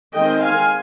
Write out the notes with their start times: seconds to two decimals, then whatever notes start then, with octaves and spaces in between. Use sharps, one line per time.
0.14 D#3 G#3 C4 D#5 G5
0.42 F5 G#5